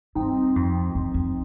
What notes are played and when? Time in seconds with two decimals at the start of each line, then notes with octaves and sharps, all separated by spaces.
0.15 G2 C4 D#4
0.56 F2
0.95 F2
1.14 F2